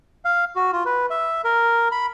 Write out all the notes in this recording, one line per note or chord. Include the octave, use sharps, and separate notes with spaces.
F5
F#4
F4
B4
E5
A#4
B5